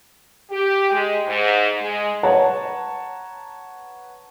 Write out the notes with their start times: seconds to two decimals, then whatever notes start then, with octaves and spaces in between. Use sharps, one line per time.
0.51 G4
0.91 G#3
1.26 G#2
1.81 G#3
2.23 B4 C#5 F#5 A5 A#5